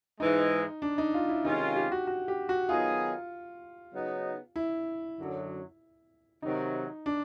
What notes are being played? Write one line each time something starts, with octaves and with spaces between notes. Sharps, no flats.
G#2 E3 G#3 D#4
D4
D#4
F4
E4
C3 D#3 G#3 C#4 D#4 F4
G4
F#4
F#4
G4
F#4
D#3 F#3 B3 D#4 F4 G#4
C#3 F#3 B3 D#4
E4
F#2 D3 F#3
C3 D#3 F#3 D#4
D4